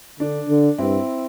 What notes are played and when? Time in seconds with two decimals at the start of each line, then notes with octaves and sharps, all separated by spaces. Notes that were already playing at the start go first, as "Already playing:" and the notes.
0.20 D3 D4
0.49 D3
0.78 G2 C4 E4